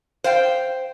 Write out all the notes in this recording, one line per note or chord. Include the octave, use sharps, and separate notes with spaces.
C5 F5 G5